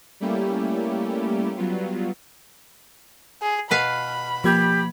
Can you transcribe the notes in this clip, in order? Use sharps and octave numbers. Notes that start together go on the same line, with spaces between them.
G3 A3 A#3 C#4 E4 G4
F#3 G3 B3 F4
G#4
B2 B4 F5 B5
F3 A#3 G4 G#6